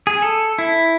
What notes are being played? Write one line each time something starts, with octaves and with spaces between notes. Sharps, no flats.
G#4
A4
E4